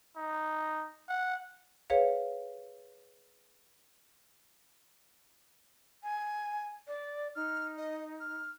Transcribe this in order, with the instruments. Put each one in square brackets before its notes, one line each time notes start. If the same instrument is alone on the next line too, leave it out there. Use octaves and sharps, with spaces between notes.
[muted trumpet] D#4
F#5
[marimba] G#4 B4 C#5 F5
[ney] G#5
D5
[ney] D#4 [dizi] F6
[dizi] D#5
F6